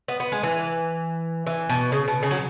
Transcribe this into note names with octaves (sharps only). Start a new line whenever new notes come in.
B3
B3
G#3
E3
E3
B2
C#3
B2
C#3
F#3